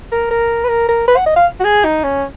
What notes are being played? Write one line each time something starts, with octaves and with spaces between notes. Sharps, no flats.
A#4
A#4
B4
A#4
A#4
B4
F#5
D#5
F5
F#4
G#4
D#4
C#4